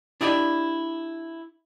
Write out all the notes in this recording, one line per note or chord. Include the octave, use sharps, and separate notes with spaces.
D4 E4 G4 D5 D#5